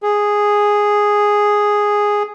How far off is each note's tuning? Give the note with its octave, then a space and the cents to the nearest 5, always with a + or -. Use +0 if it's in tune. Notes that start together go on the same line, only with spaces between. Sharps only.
G#4 -5